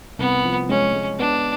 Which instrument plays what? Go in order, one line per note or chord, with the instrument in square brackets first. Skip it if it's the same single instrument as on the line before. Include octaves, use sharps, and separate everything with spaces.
[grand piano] C2 [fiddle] B3
[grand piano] F3
[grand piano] G#3 [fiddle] C#4
[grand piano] G#3
[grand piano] B3 [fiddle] D4